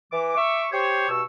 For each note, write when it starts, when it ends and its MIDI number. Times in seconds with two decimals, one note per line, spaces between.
0.12 0.34 52
0.12 0.34 86
0.36 0.67 76
0.36 0.67 85
0.36 0.67 86
0.72 1.09 67
0.72 1.09 72
0.72 1.09 73
1.09 1.22 43
1.09 1.22 47
1.09 1.22 85
1.09 1.22 88